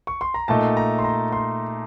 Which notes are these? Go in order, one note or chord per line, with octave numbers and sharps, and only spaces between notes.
C#6
C6
A#5
A#2 A3 D#4 A5
A#5
C6
A#5
C6